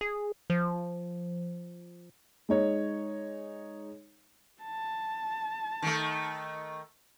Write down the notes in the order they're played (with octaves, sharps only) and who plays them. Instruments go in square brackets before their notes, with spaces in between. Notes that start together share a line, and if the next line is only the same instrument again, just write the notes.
[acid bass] G#4
F3
[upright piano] G#3 D#4 C#5
[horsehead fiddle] A5
[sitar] D#3 A3